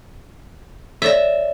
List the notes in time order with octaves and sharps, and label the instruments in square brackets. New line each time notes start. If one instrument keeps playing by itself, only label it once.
[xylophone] C#5 D5 A#6 [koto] E5